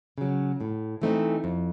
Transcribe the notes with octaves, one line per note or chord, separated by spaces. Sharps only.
C#3 F#3
A2
E3 A3 C4 D#4
F2